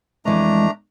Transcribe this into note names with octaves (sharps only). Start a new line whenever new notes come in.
F2 E3 G#3 A3 D4 D#5 A#5